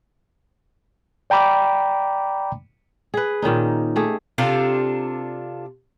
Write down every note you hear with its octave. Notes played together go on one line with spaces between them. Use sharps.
D5 G5 A#5 B5 D6
G#4 B4
A#2 D#3 C#4 D#4
A3 G4 G#4
C3 D4 F4 A4